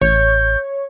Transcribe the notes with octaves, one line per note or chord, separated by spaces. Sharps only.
A1 C#5 G6